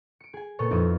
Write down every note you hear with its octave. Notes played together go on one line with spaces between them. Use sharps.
C#7 D7
G#4 G#5
A#2 B3 A4 C#5
F2 B3 C4 D#4 E4